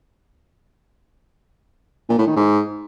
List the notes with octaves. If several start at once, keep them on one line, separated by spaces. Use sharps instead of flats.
A#2
A2
D#3
G#2